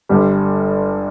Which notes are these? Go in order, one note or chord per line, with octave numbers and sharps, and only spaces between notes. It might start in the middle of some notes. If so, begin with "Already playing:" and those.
G1 G2 G3